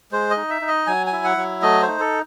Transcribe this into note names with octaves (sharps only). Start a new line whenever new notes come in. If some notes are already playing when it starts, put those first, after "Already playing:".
G#3 C5
D#5
D#4
E5
D#4
D#5
F#3 G#5
G#5
E4
F#5
F#3
A3 D#5
C5
D#4
A4